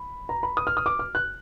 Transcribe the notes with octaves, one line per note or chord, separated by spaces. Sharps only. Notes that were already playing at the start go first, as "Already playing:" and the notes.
Already playing: B5
A#5
B5
D#6
F6
D#6
D6
F6
F#6